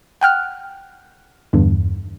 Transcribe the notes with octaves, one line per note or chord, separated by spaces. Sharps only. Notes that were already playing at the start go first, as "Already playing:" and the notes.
F#5 G5 F6 F#6
E2 G2 D3